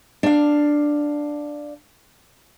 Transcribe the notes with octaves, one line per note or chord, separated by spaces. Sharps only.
D4 F5